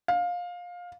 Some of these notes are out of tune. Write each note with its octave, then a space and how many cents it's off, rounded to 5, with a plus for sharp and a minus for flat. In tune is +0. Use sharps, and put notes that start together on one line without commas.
F5 +20